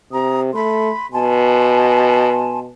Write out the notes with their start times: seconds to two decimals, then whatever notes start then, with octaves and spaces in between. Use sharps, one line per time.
0.12 C3 A#5 D#6
0.54 A3 B5 C6
1.12 B2 G#5 A5 C6